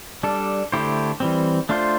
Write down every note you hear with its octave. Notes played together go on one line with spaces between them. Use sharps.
G3 D4 A4
D3 A3 E4 G4 C5
E3 G3 C4
A3 D4 F4 C5